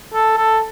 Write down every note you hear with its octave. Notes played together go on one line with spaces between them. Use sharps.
A4
A4